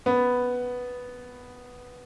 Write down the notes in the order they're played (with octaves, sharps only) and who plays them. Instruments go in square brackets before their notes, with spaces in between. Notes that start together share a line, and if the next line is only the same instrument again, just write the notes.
[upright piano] B3